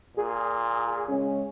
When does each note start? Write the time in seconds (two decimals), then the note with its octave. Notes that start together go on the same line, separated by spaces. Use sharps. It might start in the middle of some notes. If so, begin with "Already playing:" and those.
0.17 A#2 G#4
1.09 C#3 G#3 C#4